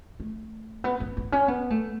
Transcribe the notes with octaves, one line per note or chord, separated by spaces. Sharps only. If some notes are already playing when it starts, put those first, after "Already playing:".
A3
B3
B3
B3
C#4
B3
A3